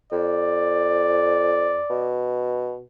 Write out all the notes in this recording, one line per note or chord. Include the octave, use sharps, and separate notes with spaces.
F2 D5
B2